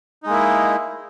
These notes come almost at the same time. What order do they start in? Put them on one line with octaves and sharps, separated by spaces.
D#4 G#3 A#3 E4